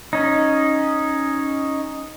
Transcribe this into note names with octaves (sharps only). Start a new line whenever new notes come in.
C#4 D#4